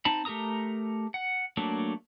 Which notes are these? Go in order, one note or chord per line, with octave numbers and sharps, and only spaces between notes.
C4 D#4 A5 B5
A3 G4 A#4 A#5 D#6
F#5
F#3 A3 A#3 D4